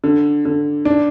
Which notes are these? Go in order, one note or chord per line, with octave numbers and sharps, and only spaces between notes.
D3
D3
D4